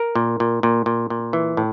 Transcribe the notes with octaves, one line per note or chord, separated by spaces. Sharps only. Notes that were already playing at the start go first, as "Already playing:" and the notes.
Already playing: A#4
A#2
A#2
A#2
A#2
A#2
E3
A2